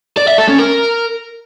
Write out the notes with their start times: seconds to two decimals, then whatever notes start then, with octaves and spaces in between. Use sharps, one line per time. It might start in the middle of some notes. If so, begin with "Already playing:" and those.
0.17 D5
0.28 E5
0.38 A4
0.49 C#4
0.59 A#4